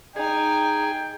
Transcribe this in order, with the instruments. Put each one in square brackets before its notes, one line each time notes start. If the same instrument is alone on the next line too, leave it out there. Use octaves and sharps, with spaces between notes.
[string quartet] D#4 G#5 [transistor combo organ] G#4 [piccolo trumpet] G5